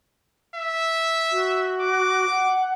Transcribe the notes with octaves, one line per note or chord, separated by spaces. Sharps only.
E5
F#4
D6
F#5